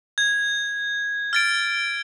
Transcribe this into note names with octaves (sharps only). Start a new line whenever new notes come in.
G#6
F6 A6 D7